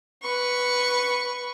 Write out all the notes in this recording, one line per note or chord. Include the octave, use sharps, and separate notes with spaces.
B4 C#6